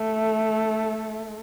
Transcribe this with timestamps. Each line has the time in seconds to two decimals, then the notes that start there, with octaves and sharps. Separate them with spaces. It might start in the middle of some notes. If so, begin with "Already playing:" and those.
Already playing: A3